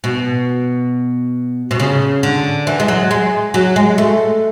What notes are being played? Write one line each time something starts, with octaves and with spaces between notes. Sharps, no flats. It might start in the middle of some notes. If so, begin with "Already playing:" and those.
B2
B2
C#3
D3
E3
G#3
F#3
G#3
F#3
G#3
A3